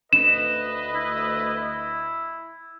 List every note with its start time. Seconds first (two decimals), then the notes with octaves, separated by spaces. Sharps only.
0.13 D2 B4 D#5 E7
0.95 E4